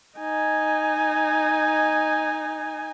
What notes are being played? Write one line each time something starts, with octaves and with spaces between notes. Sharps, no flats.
D#4 G#5